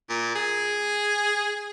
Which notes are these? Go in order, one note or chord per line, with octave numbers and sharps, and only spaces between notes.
A#2
G#4